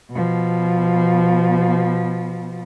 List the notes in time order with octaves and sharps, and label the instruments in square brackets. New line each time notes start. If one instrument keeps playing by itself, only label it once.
[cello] B2 F3